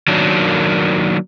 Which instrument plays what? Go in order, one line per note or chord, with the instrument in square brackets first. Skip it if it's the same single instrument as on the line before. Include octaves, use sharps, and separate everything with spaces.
[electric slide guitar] D#3 F#3 A#3 D4